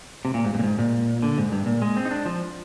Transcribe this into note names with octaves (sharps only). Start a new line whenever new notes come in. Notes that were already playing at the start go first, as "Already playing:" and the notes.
C3
A#2
G#2
G2
A#2
G#2
A#2
D3
G#2
G2
A#2
G#3
C4
D#4
D4
F3